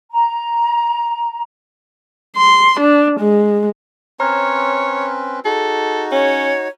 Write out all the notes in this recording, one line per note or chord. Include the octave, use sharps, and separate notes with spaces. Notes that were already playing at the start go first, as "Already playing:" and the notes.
A#5
C6
D4
G#3
C4 C#4 B4 C#5 A#5 F6 G#6
D#4 F#4 G#4 A4
C#4 C#5